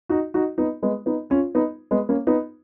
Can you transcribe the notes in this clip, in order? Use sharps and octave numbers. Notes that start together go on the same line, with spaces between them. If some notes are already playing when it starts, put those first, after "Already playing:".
D#4 F#4
D#4 F#4
B3 D#4
G#3 B3
B3 D#4
C#4 F4
B3 D#4
G#3 B3
A#3 C#4
B3 D#4